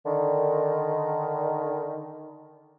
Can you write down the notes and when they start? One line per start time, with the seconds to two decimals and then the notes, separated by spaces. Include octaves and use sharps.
0.05 D3 D#3